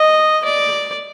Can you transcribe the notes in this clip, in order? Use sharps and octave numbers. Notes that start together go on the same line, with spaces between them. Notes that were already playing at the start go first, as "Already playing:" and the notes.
Already playing: D#5
D5